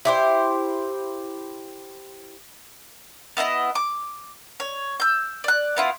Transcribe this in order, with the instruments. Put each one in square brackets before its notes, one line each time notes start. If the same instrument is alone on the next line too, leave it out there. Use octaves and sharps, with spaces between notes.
[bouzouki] E4 G4 C5
[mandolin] B3 E4 C5 D#5
D6
C#5
E6 G6
D5 F#6
B3 E4 F4